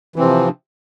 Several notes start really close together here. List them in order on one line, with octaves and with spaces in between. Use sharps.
E3 C4 C3 F3